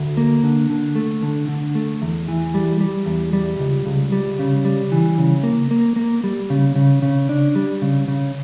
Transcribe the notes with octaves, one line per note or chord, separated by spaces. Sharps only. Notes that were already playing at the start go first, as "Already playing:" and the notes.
Already playing: D2
A#3
D3
D3
A3
D3
D3
A3
E2
E3
G3
G3
E2
G3
C#2
C#2
G3
C#3
G3
E3
C#3
A#3
A#3
A#3
G3
C#3
C#3
C#3
D4
G3
C#3
C#3